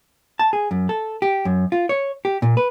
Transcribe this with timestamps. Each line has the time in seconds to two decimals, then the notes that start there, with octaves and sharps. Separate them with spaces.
0.39 A5
0.53 G#4
0.71 F#2
0.89 A4
1.22 G4
1.45 F#2
1.72 F4
1.89 C#5
2.25 G4
2.42 A#2
2.57 B4